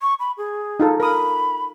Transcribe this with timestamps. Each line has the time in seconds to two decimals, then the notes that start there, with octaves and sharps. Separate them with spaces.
0.01 C#6
0.19 B5
0.37 G#4
0.80 D#4 F4 A4
1.00 A#4 B5 D#6